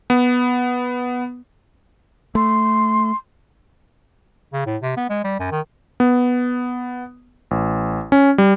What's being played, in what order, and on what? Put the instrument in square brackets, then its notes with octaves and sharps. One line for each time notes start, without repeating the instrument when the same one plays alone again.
[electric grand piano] B3
[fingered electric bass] A3 [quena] C6
[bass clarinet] C#3
A2
C3
B3
G#3
G3
F#2
D#3
[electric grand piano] B3
A1
C#4
G3